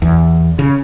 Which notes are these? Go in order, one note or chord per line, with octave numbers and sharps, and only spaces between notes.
E2
C#3